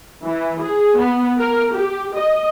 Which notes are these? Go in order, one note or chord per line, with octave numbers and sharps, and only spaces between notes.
E3
G#4
B3
A#4
G4
D#5